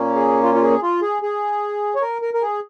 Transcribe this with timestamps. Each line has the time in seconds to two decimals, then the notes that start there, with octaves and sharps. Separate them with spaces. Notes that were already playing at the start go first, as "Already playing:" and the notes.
Already playing: A#2 A#3 C#4
0.15 G#4
0.43 F4
0.55 F4
0.62 G#4
0.83 F4
1.02 G#4
1.22 G#4
1.95 C#5
2.02 A#4
2.22 A#4
2.34 A#4
2.42 G#4